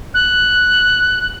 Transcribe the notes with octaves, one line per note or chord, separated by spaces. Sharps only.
F#6